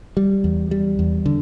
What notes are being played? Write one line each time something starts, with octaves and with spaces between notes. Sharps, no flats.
G3
E2
G3
E2
D3